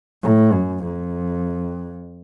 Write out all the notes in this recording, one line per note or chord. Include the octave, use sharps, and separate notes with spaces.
A2
F#2
F2